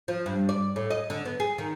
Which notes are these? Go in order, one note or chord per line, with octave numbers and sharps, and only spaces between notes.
F3
G2
D5
A2
D#5
D3
B3
G#4
D#3